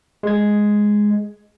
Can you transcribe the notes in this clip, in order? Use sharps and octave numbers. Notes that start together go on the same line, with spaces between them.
G#3 G#6